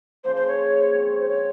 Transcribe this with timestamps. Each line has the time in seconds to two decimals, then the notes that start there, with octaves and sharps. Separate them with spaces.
0.24 C#3 F3 A#3 C5
0.36 C5
0.48 C#5
0.93 G#3 C4 F4
1.20 C5
1.29 C#5